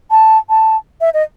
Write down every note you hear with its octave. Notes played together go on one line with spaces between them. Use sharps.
A5
A5
E5
D#5